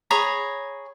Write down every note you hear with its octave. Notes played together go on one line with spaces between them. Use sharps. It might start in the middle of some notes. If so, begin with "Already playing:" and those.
G#4 C#5 A#5 B5